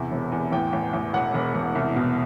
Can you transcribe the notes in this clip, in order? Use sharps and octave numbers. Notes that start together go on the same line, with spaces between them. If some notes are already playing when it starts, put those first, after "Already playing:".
Already playing: E2 C3
E1
E2
A1 G5
A1
A1
E1 F#5
E1
E1
C2
B2